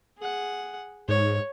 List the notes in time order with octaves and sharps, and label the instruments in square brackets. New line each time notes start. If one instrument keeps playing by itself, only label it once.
[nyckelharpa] G#4 F#5
[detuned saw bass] G#2 [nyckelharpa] C#5